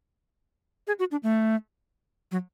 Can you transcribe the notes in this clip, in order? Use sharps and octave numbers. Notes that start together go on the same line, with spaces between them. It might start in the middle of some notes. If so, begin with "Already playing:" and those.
G#4
F#4
D4
A3
F#3